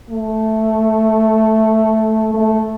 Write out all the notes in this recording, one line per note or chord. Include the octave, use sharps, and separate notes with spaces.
A3
A3